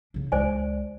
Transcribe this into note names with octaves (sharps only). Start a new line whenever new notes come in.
C#3 D4
C#2 C5 D5 G#5